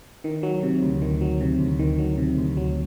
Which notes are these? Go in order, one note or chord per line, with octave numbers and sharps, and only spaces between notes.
D#3
F#3
C3
D2
D#3
F#3
C3
D2
D#3
F#3
C3
D2
F#3